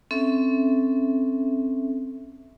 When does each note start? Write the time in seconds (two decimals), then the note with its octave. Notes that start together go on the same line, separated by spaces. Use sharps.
0.11 C4 C#4 A4 E5